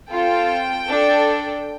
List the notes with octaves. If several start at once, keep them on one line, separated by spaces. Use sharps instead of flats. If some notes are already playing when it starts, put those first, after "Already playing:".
C4 F4 A4 G5
D4 A4